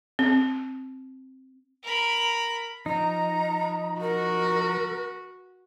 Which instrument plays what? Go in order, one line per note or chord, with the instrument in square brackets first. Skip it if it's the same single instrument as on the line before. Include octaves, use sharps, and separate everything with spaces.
[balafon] C4
[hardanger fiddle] A#4 B5
[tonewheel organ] F3 [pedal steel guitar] D#4 [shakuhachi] A#5
[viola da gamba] F#4 [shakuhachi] A#4